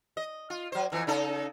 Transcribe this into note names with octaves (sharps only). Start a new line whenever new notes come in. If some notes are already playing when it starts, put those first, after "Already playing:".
D#5
F4
F#3 C5
F2 E3
C#3 D#4 A4